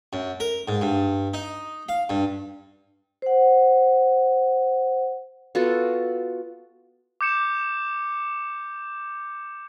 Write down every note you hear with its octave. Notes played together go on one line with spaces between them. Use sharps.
F#2
A#4
G#2
G2
D#4
F5
G2
C5 F#5
B3 F4 F#4 A4
D6 G6 C#7 E7